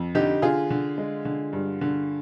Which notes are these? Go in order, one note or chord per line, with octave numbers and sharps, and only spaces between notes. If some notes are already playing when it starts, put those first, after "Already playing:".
Already playing: F2
D3 D#4 G4
D3 F4 G#4
D3
G#3
D3
G2
D3